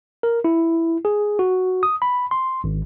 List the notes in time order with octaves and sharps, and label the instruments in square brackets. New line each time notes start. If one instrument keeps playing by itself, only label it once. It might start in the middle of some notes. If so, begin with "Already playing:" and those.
[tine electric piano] A#4
E4
G#4
F#4
D#6
B5
C6
G#1